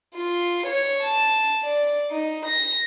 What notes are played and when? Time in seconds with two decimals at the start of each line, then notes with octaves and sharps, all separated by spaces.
0.17 F4
0.66 C#5
1.04 A5
1.63 D5
2.10 D#4
2.46 A#6